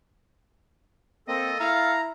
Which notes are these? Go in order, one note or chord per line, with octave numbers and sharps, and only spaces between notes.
A#3 C4 A4 D#5
E4 F5 A#5